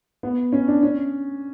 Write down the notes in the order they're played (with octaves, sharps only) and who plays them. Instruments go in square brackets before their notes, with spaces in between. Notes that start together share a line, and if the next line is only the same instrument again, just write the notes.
[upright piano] B3
C#4
D4
C#4